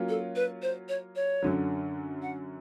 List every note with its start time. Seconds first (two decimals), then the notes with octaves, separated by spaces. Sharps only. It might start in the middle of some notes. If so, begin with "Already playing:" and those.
Already playing: F#3 A#3 C#4 F4
0.09 A4
0.36 B4
0.62 C5
0.89 C#5
1.16 C#5
1.42 F#2 D3 F#3
2.22 F#5